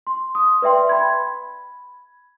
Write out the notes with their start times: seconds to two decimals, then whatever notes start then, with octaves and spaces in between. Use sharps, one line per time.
0.07 C6
0.35 D#6
0.62 B4 D5 E5 G5 C6
0.89 B5 G#6